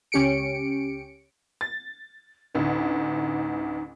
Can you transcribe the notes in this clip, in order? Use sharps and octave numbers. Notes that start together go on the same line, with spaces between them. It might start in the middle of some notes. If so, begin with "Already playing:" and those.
C#2 C#4 G4 C#7 D7
A6
A1 D2 D#4